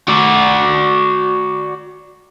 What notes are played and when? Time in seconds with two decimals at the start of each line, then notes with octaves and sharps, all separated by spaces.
0.08 F#4 D5